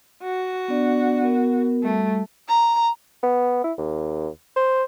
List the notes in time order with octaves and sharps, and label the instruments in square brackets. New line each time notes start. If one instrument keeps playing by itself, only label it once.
[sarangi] F#4
[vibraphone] B3 D4 D5
B3 A#4
[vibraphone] G3 [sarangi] A3
[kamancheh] A#5
[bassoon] B3
E4
D#2
C5